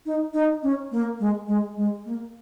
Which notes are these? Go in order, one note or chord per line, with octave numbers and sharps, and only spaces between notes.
D#4
D#4
C#4
A#3
G#3
G#3
G#3
A#3